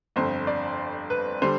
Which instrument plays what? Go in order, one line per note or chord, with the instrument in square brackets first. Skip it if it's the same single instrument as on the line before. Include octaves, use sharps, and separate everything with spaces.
[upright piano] G1 F2 D3 C5
D5
B4
D3 G3 C5